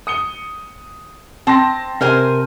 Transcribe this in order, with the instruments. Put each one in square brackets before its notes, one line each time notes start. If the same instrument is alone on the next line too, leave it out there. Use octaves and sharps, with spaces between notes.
[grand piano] D#6 C#7 G7
[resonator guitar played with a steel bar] C4 [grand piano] A5 C6 A#6
[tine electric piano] C3 [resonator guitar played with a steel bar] A#4 C5 G#5